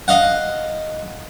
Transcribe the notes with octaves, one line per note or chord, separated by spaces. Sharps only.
D#5 F5 F#5